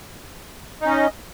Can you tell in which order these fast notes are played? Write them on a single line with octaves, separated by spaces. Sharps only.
D#4 C#4 D#5